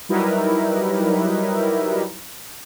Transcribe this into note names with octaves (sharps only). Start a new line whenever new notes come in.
F#3 G3 D#4 E4 A#4 B4